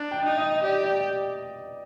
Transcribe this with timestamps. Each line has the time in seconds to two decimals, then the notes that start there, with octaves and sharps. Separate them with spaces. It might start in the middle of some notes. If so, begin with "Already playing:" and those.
Already playing: D4
0.11 G5
0.24 D#4
0.37 D#5
0.63 G4 D5
0.83 D5